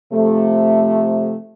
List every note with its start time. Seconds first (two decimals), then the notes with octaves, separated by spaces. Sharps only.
0.12 C3 F3 A3